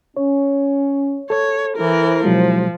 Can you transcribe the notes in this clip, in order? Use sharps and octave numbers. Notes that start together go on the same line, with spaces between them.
C#4 C#5
A4 C#5
E3 E4 A#4 C5
B2 F3 F#3 G#3